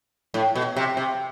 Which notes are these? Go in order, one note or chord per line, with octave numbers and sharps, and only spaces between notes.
A2
B2
C3
C3